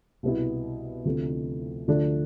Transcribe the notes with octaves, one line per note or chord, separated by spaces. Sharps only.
C2 B2 B3 E4
D2 C3 F3 A3 D4
D2 D3 F3 A3 D4